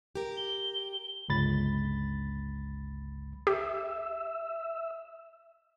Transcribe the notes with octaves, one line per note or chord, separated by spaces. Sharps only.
G4 A#4
G7
G1 C#2 B5 A6
G4 E5